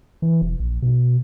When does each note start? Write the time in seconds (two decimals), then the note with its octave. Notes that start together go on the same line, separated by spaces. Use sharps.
0.22 E3
0.41 E1
0.60 A#1
0.82 B2